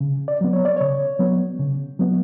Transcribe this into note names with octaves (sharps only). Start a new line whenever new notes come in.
C#3
D5
F#3 B3
C#5
D5
C#3 C#5
F#3 B3
C#3
F#3 B3